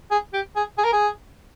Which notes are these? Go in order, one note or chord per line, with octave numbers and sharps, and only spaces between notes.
G#4
G4
G#4
G#4
A#4
G#4